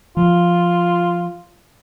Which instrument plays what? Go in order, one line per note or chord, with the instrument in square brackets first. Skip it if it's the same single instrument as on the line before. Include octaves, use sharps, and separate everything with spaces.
[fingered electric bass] F3 [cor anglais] F4